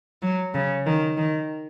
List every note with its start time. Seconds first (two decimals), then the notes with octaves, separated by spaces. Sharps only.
0.22 F#3
0.54 C#3
0.86 D#3
1.17 D#3